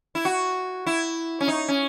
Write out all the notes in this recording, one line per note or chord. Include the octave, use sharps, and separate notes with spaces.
E4
F#4
E4
C#4
D#4
C#4